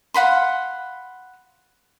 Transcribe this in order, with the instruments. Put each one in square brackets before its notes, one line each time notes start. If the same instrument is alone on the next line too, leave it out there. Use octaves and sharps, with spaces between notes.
[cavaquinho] F5 F#5 B5 C6